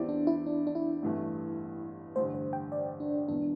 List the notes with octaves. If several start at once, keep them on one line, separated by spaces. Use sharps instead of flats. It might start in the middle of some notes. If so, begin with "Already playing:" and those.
Already playing: E2 E3 C4 E4 G4 D5
D4
E4
D4
D4
E4
A1 G2 E3 A3
A1 G2 D3 C5
C5
G5
D5
D4
E1 E2 E3 D4